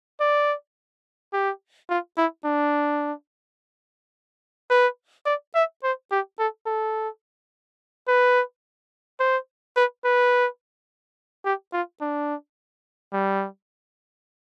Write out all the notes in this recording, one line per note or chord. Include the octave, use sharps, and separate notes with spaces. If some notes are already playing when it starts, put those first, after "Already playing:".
D5
G4
F4
E4
D4
B4
D5
E5
C5
G4
A4
A4
B4
C5
B4
B4
G4
F4
D4
G3